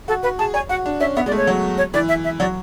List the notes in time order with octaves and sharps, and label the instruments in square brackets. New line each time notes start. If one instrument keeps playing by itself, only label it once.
[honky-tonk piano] F#4 [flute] A4
[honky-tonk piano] F#4 [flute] B4
[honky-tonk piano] G#4 [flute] A5
[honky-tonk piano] C#5 [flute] G#5
[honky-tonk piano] F#4 [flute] F#5
[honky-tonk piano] D4
[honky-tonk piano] C#4 [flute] E5
[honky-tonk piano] B3 [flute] E5
[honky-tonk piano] G#3 [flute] D5
[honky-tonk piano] A3
[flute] C#5
[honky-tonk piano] F#3
[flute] C#5
[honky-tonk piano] E3 [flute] D5
[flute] E5
E5
[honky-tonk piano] F#3 [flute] D5